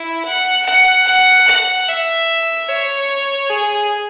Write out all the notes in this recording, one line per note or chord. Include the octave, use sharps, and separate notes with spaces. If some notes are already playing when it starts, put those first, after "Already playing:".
Already playing: E4
F#5
F#5
F#5
F#5
E5
C#5
G#4